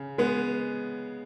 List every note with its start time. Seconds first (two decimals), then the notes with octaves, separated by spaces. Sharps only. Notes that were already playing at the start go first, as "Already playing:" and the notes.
Already playing: C#3
0.18 G#3 B3